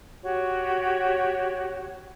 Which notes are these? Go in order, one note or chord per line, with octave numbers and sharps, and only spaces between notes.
F#4 G4 C#5